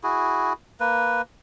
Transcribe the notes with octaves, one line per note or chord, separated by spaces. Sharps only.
E4 F#4 G#4
A#3 B4